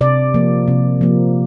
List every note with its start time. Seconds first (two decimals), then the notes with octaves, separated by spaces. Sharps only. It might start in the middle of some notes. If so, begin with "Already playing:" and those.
0.01 C3 D5
0.34 F3 A#3
0.68 C3
1.01 F3 A#3